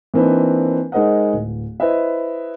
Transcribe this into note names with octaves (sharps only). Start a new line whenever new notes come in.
E3 A#3 C4 D4 D#4 B4
G#3 D#4 A#4 C5 D#5 F#5
D1
E4 B4 C5 D#5 E5